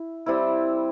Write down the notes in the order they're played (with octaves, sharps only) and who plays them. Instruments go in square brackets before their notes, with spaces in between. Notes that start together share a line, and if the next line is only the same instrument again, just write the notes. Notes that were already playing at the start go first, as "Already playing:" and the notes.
Already playing: [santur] E4
G3 C4 E4